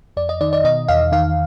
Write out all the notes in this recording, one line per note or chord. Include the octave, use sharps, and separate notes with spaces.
F2 D5
D#5
D#3 D5
D5
B2 D#5
E2 F5
D#3 F5